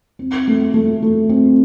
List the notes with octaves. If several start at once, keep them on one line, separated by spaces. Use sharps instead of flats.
C4
A3
A3
A3
C4